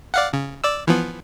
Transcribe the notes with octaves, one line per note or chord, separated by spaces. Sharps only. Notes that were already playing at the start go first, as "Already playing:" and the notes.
D5 F5 F#5
C#3
D5 E6
E3 F3 B3